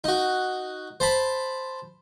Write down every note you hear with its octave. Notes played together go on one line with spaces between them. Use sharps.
D#4 F#4
C5 A5 B5